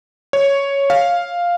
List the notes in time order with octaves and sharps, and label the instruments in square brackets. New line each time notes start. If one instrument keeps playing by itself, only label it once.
[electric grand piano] C#5
F5